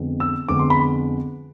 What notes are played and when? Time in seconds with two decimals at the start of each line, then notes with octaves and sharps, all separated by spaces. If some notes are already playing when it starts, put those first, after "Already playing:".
Already playing: F2 D3 G#3 B3
0.20 E6
0.49 F2 D3 G#3 B3 D6
0.59 C6
0.70 B5